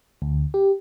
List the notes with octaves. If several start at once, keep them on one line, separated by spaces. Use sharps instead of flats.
D2
G4